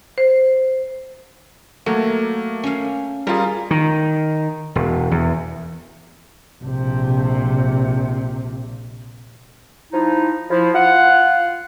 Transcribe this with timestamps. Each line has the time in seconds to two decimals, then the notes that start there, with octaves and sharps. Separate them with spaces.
0.18 C5
1.86 F#3 A3 A#3
2.63 C#4 F5
3.27 G3 F4 G#4 A#4 A#5
3.71 D#3
4.75 E1
5.11 E2
6.64 A#1 C3
9.92 F3 D#4 E4
10.50 F3 E4
10.75 F4 F#5